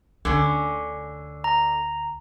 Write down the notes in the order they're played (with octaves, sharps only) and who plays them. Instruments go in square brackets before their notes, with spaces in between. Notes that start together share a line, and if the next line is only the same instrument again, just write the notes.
[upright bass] D2 [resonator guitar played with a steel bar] D3 C#4
[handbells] A#5